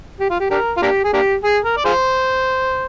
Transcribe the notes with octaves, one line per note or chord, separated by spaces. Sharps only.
G4
F4
G4
D4 G4 A#4
F4
A#3 D4 G4
G#4
A#3 D4 G4
G#4
A#4
D5
F4 G#4 C5